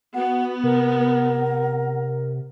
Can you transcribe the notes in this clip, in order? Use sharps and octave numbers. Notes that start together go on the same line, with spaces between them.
B3 F#4 F#5
C3 A#4 F#5